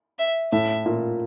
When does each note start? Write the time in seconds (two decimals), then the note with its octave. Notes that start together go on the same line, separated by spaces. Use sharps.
0.19 E5
0.52 A2 E5
0.86 A#2